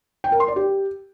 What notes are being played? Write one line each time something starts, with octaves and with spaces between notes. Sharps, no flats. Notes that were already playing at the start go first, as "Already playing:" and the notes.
G5
A#4
C6
D5
G4